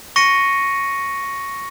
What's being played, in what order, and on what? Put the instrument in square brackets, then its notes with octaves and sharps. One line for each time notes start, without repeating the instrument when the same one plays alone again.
[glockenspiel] C#6 A#6 C#7 D#7